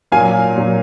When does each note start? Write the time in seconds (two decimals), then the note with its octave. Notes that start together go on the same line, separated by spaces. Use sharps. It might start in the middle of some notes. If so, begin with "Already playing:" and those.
0.12 A#2 F#3 A#3 F5 G#5
0.56 A#2 F#3 A#3